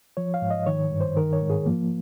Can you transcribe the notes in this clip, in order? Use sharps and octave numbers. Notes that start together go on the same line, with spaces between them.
F3 C#5
F5
G#2
D#5
D#3 C#5
G2
C5
D#3 A#4
C#5
G#2
G#4
F3 A#3